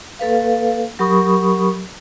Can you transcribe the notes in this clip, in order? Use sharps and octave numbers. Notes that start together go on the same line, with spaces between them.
A#3 A4 B4 F5
F#3 G4 A#4 B5 C#6 D#6